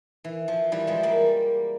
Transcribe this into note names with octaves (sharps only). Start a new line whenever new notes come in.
E3
F3
E3 G3
F3 G#3
G3 A#3